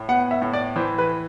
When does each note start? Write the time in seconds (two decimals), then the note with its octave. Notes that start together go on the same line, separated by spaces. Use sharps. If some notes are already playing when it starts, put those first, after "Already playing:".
Already playing: A2
0.09 B3 F#5
0.31 E5
0.42 A2
0.53 D5
0.76 E3 C5
0.98 B4